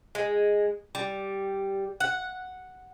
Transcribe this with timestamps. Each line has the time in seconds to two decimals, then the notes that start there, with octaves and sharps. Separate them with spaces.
0.15 G#3
0.95 G3
2.00 F#5